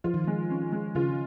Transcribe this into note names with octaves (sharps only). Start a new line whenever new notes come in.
F3 F4
D#3
F3 G#3
C#4
G#3
C#3 F4